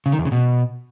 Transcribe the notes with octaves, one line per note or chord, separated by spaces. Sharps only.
C#3
D#3
E2
C#3
B2